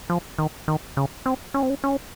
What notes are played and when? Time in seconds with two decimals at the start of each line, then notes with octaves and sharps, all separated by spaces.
0.10 F3
0.38 D#3
0.68 D#3
0.97 C#3
1.26 C4
1.54 C#4
1.63 C4
1.70 C#4
1.84 C#4